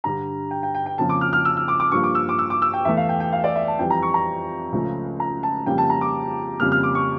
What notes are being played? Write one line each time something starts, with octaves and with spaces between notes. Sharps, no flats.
G2 D3 G3 A#5
G5
G5
G5
G5
F2 C#3 F3 A#3 A5
D6
F6
F6
E6
E6
D6
D6
G2 F3 A#3 C#6
D6
E6
D6
E6
D6
E6
G5
E2 E3 A3 E5
F5
G5
G5
F5
D5
E5
A5
F2 E3 G3 G5
A#5
C#6
A#5
C#2 C#3 F3 A3
A#5
A5
F2 C#3 G3 A#3 G5
A5
A#5
D6
F2 C#3 G3 A#3 F6
F6
D6
C#6